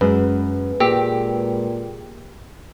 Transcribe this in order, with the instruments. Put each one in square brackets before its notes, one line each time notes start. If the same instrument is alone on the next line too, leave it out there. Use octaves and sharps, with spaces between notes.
[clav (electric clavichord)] F#2 [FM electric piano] G#3 B4
[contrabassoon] A#2 [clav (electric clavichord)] G4 [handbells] G#4 G5 E6